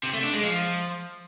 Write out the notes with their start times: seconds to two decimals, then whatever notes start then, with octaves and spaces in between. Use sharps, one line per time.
0.04 C3
0.13 A3
0.23 D4
0.33 G#3
0.43 F3